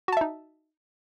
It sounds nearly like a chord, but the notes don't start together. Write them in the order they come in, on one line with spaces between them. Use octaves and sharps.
F#4 A5 E5 D#4